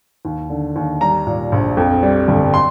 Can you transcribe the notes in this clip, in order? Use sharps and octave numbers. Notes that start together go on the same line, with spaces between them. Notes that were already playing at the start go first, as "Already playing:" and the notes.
D#2
D3
D#2
G3 A#5
A#2
A#1
F2
G3
G1
C6